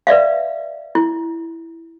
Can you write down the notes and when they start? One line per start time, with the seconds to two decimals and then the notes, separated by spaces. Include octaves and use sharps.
0.07 B4 D5 E5 F5
0.95 E4